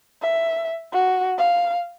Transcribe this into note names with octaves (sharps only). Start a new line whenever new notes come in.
E5
F#4
F5